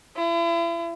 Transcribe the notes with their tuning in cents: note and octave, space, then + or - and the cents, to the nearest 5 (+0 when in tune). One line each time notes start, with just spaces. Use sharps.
E4 +40